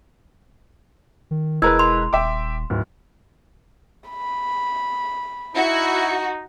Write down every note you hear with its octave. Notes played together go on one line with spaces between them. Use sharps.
D#3
E1 G#3 E4 A#4 B4 E6 G#6
C6
D#1 E5 G5 D6
D1 G#2
B5
D#4 E4 F#4